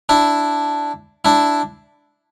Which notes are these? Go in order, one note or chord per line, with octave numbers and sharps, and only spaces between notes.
D4 E4
D4 E4